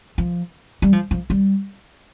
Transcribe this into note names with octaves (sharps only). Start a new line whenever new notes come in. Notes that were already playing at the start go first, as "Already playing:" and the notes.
F3
G3
F3
F3
G3